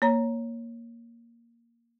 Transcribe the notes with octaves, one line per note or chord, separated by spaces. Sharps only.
A#3 C#5 A#5